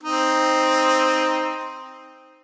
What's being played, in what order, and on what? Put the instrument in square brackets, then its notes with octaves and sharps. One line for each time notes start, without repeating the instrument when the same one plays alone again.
[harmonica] C4 D#4